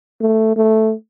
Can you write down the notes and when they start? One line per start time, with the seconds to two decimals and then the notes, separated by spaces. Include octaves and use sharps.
0.21 A3
0.56 A3